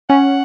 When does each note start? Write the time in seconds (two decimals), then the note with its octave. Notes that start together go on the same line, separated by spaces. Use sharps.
0.09 C#4 F#5